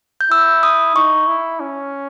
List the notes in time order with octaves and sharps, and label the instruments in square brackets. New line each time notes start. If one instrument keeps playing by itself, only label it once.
[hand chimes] G6
[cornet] E4 [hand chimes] E6
[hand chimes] D#6
[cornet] D#4 [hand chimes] C#6
[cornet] E4
C#4